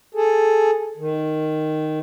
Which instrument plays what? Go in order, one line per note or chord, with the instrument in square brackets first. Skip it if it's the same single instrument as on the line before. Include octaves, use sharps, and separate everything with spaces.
[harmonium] G#4 A4
D#3